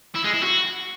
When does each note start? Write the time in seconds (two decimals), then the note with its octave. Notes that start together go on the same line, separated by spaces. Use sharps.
0.15 E4
0.24 G#3
0.33 E4
0.42 F#4